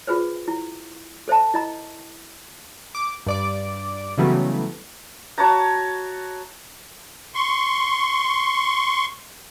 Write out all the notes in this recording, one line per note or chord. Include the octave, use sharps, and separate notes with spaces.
F4 G#4 B4 C5
E4
A4 C5 E5 A5
E4 D#5 A#5
D6
G2 D5 D6
C#3 E3 F#3 G3 A3 B3
F#4 C#5 A5 A#5
C6 C#6